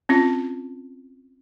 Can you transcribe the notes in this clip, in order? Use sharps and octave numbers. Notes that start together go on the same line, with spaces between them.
C4 C#4 F4